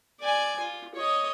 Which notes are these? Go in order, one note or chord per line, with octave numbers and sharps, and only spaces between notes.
D5 G#5
F4
C#5 D#5